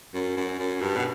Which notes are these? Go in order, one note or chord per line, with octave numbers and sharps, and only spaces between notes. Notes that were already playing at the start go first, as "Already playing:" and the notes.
F#2
F#2
F#2
G2
B2